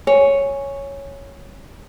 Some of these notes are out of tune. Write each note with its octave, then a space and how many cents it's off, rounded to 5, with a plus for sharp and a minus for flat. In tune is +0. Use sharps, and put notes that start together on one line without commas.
C#5 +0 G#5 +0